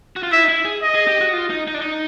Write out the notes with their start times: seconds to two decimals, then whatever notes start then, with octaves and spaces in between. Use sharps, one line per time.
0.16 F#4
0.23 F4
0.31 E4 E5
0.43 D#4
0.48 E4
0.65 G#4
0.82 D#5
0.95 G#4
1.07 G4
1.21 F#4
1.33 F4
1.50 D#4
1.68 D#4
1.74 D4
1.82 D#4